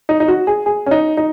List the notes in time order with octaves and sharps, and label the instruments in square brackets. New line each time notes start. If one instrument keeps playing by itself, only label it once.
[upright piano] D#4
D#4
F#4
G#4
G#4
C#4
D#4
D#4